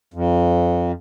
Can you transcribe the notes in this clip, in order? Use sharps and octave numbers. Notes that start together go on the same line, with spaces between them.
F2